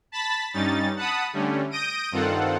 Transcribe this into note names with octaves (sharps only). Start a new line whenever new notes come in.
A5 B5 A6 B6
G2 G3 C#4 D#4 A6
F#5 A5 B5 D#6
D3 G3 A3 C#4
D#6 G6 A#6 D7 D#7
G2 D#3 C4 F4 A4 F#5